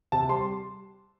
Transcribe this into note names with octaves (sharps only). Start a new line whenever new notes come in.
C3 A5
G3 C6